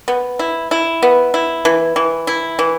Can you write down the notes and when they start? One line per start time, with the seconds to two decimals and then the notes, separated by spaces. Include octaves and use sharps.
0.08 B3
0.39 E4
0.71 E4
1.03 B3
1.34 E4
1.65 E3
1.96 E3
2.27 E4
2.59 E3